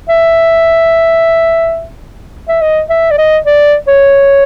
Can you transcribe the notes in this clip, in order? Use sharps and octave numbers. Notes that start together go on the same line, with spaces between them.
E5
E5
D#5
E5
D5
D#5
D5
C#5